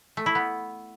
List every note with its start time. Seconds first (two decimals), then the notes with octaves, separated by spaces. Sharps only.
0.17 A3
0.26 E4
0.35 B3